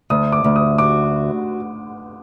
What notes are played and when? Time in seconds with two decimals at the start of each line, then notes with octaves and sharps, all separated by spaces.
0.10 D2 D#6
0.32 D6
0.44 D2
0.56 D#6
0.78 F#4 D6